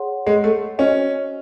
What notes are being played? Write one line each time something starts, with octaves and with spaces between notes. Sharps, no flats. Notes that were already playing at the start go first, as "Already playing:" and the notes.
Already playing: G#4 C#5 F#5 C6
G#3
A3
C#4 F#4 C5 D#5